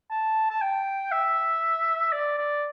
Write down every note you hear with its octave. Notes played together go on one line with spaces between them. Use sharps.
A5
A5
G5
E5
D5
D5